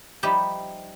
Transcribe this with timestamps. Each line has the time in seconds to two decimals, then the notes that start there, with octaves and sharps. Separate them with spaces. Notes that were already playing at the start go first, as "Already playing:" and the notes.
0.23 F3 G3 D#4 E4 G4 B5